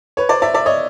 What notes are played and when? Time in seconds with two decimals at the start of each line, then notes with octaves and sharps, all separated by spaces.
0.17 B4 C#5
0.29 C5 D5
0.42 D5 E5
0.54 D5 E5
0.66 C#5 D#5